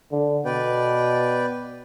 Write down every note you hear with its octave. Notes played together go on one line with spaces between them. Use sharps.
D3
B2 B4 D5 G5